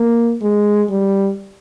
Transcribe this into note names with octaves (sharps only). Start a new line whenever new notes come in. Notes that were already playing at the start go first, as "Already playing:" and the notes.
Already playing: A#3
G#3
G3